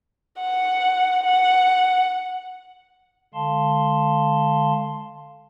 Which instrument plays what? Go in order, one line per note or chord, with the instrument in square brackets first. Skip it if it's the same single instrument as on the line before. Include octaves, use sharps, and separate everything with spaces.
[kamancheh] F#5
F#5
[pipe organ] D3 G#3 F5 A5 C6